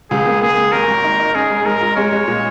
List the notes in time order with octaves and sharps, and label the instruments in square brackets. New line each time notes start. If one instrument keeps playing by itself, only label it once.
[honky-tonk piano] C#2 [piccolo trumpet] G#4
[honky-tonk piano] A#3
[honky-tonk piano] A#3 [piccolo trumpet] G#4
[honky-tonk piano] A#3
[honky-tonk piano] G#1 [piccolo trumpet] A#4
[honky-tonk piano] G#1
D#4
D#4
[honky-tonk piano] C#4 [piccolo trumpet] G#4
[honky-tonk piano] G#2
[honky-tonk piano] G#2 [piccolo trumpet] A#4
[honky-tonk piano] F4
[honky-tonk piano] G#3 [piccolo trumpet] C#5
[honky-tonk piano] G#3
A#2